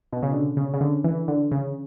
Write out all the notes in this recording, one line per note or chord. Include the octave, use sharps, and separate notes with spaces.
B2
C#3
D3
C#3
C#3
D3
E3
D3
C#3